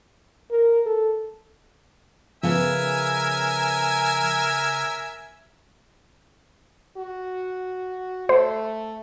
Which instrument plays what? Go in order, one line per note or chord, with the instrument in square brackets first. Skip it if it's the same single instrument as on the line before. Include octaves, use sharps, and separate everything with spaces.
[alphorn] A#4
A4
[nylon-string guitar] C#3 B3 [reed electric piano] F3 [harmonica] A#4 E5 G#5
[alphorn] F#4
[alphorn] A3 [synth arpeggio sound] C5